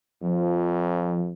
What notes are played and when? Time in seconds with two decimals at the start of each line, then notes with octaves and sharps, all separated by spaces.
0.22 F2 F3